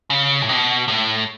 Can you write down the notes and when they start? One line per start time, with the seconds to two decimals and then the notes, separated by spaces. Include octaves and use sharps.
0.10 C#3
0.42 A2
0.49 B2
0.88 A2